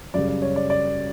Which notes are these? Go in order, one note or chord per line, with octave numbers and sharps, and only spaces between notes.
F#2 C#3 G3 D5
D5
C#5
D5
D5